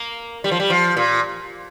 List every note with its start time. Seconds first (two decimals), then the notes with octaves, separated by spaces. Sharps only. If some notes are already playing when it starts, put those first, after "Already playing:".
Already playing: A#3
0.44 G3
0.51 F3
0.60 G3
0.70 F3
0.97 A#2